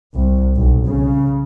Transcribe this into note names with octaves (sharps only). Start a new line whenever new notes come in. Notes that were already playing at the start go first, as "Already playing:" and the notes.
C2
B1
C#3